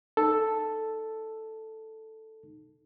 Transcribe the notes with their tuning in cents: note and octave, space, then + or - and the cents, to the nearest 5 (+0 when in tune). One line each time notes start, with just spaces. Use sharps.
D#4 -15 A4 +0